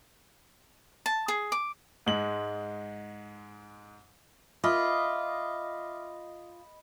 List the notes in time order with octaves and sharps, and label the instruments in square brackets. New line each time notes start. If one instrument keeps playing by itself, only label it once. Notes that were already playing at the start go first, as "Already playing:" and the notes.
[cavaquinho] A5
G#4
D6
[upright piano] G#2 G#3 F#7
[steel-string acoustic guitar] F4 [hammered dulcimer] D#5 B5 [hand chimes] E5 D6 F6